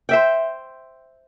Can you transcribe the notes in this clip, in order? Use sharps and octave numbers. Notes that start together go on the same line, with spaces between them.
C5 E5 G5